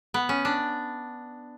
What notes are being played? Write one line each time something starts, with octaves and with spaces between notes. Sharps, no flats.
B3
C#4
D4